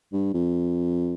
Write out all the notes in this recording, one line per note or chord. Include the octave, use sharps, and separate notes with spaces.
G2
F2